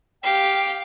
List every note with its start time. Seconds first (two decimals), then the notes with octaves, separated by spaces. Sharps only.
0.24 G4 F5 G5